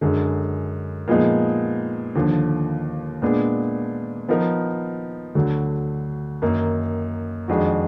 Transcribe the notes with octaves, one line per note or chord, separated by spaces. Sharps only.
F#2 D3 G#3
A#2 F3 G#3 B3 D#4
D#2 D3 F3
A#2 G#3 B3 D4
F3 B3 D#4 A#4
D2 D3 F#3
F#2 D#3 A#3 D#4
F2 D#3 G#3 D4 F#4